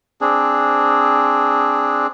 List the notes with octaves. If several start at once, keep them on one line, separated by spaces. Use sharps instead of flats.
C4 D4 G#4